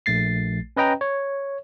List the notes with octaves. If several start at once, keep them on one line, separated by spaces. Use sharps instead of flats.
A#1 A3 A6 C7
C#4 B4 D#5 G5 A#5
C#5